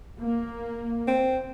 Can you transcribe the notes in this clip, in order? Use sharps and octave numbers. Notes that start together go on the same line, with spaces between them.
A#3
C4